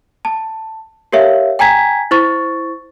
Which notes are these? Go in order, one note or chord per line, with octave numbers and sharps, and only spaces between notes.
A5
G4 A#4 C#5 E5 F5
G5 G#5 A#5 G#6 B6
E4 C5 C#6 A6